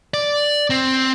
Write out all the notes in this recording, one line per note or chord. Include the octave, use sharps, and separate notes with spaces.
D5
C4